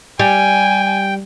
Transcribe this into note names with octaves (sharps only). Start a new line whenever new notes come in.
G3 G5 G#5